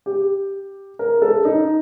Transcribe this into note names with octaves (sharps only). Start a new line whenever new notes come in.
G4
A#4
A4
D#4